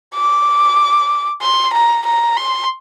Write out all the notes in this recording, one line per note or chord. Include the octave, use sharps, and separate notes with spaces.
D6
C6
A#5
A#5
C6